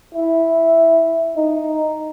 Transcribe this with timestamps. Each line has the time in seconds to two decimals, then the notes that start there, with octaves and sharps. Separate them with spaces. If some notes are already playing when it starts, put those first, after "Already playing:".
0.15 E4
1.37 D#4